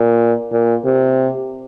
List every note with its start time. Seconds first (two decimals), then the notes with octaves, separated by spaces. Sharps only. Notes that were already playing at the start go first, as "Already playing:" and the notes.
Already playing: A#2
0.52 A#2
0.85 C3